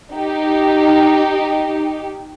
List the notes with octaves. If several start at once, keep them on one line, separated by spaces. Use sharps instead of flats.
D#4 G4